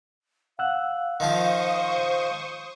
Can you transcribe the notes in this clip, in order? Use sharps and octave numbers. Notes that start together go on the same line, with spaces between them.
F5 F#5 E6 F#6
D#3 F3 F4 C5 C#6 D#6